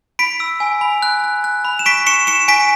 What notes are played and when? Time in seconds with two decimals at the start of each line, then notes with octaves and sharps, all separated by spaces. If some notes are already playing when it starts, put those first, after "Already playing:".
0.19 B5 B6 D7
0.40 E6
0.60 G#5
0.81 B5
1.02 F#6
1.24 F#6
1.44 F#6
1.65 B5
1.79 E7
1.86 C#6 B6 D7
2.07 C#6 C#7 E7
2.27 C#6 C#7 E7
2.48 G#5 B6 D7